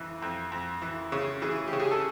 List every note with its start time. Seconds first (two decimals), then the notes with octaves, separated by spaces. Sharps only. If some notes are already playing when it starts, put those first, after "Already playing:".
Already playing: F2 E3
0.22 F2
0.52 F2
0.82 E3
1.12 C#3
1.42 E3 G#4
1.68 G4
1.73 C#3
1.80 G#4
1.91 A4